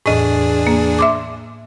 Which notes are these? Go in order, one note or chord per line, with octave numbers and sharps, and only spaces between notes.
E2 A2 D4 G#4 D#5
A#3
E5 C6 D6